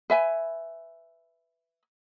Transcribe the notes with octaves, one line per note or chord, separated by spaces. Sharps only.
B4 E5 G#5